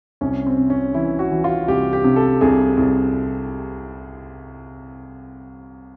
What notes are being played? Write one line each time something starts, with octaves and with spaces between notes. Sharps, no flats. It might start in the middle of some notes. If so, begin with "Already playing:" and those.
C2 C#4
C4
C3
C#4
E3 E4
F#4
E3
F4
C2 G4
G4
C3
A4
C2 G#4
C2